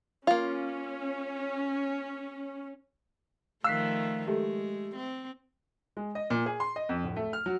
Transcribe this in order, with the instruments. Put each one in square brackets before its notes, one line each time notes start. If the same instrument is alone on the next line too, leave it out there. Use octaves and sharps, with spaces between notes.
[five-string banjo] A#3 F4 [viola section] C#4
[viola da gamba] D#3 F3 A3 [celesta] F5 F#6 B6 [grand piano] E6 C7
[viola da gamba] G#3 [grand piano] A3 [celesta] G4
[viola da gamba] C4
[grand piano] G#3
D#5
A#2
G#4
C6
D#5
F2
D1
A3
F6
F#3